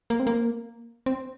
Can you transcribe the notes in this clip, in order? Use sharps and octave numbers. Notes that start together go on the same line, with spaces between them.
A#3
C4
A#3
C4